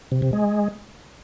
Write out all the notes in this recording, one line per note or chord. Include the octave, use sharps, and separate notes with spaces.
C3
C3
G#3